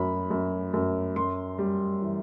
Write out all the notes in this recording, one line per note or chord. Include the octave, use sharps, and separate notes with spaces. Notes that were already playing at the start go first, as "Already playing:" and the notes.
Already playing: F#2 F#3 B5
F#2
F#2
F#2 C6
G3
E3